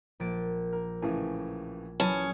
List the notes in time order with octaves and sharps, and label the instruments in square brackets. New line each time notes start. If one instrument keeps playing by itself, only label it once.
[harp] A#1 A6 D7
[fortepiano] A#4
[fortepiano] A2 C#3 E3 [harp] G#5
[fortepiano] E3 A5 B5 [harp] F#3 G#4 [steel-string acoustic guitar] C#4